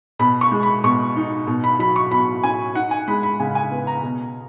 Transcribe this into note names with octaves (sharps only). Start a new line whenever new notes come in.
B2 B5
C#6
G#3
B5
B2 C#6
D#4
B2
B5
F#3 B5
C#6
B2 B5
C#4 G#5
D#4 F#5
G#5
G#3 B5
B5
C#3 G#5
G#5
B3
A#5
B2